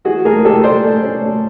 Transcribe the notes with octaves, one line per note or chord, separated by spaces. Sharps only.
E3 F#4 G#4
A3 G#4 A#4
A3 G4 A4
A3 C5 D5
A3
C#4
A3